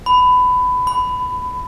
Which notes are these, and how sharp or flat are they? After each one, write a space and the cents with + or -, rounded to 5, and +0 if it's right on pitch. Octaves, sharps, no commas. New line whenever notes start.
B5 +20
B5 +35